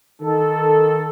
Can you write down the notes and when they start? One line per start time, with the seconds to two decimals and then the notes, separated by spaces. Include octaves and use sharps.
0.22 D#3 A4